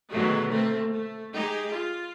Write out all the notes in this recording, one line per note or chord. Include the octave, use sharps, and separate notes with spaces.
B2 D3 D#3 F#3 G#3 A3
A3 A#3 C4
A3
G#3 D#4 G4 G#4
F4